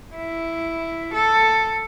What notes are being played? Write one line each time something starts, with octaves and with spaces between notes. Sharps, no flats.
E4
A4